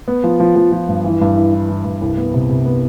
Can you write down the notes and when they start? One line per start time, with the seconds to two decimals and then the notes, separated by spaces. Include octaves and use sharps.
0.08 B3
0.24 F3
0.40 F3
0.56 F3
0.72 F3
0.88 G2
1.04 E3
1.21 G2
1.36 E4
1.53 E4
1.69 E3
1.85 G2
2.01 C2
2.17 B3
2.34 C3
2.49 C3
2.65 B3